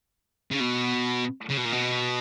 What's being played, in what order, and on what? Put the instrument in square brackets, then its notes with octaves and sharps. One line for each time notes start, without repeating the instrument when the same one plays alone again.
[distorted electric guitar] C#3
B2
C#3
B2
A#2
B2